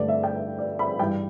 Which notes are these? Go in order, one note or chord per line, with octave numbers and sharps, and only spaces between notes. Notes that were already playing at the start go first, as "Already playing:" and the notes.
Already playing: G2 D3 A3 D5
E5
G5
D5
B5
G2 E3 G3 G5